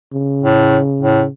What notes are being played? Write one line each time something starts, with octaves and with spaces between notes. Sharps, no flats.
C#3
A2
A2